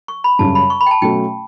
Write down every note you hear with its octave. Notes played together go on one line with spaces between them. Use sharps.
C#6
B5
F#2 C#3 G3 C#4 A5
B5
C#6
B5
G5
A5
B2 F#3 A3 C#4 F#4 G5